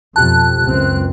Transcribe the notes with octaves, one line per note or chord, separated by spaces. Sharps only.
F2 B2 G4 A5 F#6
C#2 F#2 C4